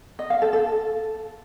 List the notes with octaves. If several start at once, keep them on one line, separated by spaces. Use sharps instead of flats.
D#5
F5
A4
A4